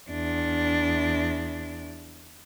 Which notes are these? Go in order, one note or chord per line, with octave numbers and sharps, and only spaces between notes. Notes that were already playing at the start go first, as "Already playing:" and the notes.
E2 D4